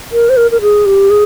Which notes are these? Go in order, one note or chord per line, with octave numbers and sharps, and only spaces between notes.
A#4
C5
A#4
A#4
G#4
G4
G#4